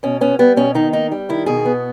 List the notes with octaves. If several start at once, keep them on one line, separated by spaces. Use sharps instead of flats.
B2 C#4
B3 C#4
G3 B3
B2 C#4
D#3 D#4
A#3 D#4
G3
D#3 E4
B2 G#4
B3